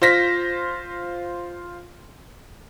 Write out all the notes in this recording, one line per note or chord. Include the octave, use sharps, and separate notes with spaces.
F4 C5 A#6 B6